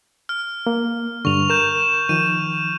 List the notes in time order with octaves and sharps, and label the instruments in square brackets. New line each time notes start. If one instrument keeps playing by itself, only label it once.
[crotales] F6
[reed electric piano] A#3
[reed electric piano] G2 D3 [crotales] C#6 F7
[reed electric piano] A#4 [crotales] G6 E7
[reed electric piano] D#3 F3 [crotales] D#7